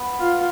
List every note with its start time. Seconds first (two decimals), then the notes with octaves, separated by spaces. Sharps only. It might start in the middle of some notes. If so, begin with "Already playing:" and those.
Already playing: B3
0.19 F4